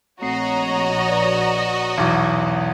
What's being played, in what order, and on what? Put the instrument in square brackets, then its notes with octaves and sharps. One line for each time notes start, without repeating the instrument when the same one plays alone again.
[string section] A#1 C#5 A#5 [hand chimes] A3 C4 C7 [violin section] F#4 D#5
[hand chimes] B4 D5
[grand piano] B1 E2 [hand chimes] D6